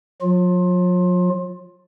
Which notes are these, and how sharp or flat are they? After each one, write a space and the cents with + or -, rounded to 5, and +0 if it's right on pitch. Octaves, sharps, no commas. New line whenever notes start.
F#3 -45 F4 +20